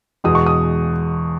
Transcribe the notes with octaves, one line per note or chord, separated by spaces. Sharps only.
E2 B2 G#3 D#6
C#6
D#6